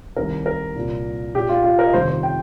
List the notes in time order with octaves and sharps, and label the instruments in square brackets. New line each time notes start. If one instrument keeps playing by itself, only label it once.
[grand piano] C2 C3 D#3 A#4
A#4
C2 A#2
A#1 A#2 G4
F4
F4
A#4
D#5
G1 F2 C3 D#3 C5
C5
G5